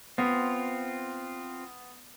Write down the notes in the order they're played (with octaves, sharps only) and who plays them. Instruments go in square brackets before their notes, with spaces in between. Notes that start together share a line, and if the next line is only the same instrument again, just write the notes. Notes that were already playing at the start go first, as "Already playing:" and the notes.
[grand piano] B3 [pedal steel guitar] C4 F4